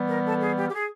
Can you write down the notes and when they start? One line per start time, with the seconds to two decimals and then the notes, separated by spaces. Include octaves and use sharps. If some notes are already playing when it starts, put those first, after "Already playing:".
Already playing: E3 G3 B3
0.09 A#4
0.25 A4
0.37 A4
0.41 G#4
0.57 G4
0.69 G4
0.74 G#4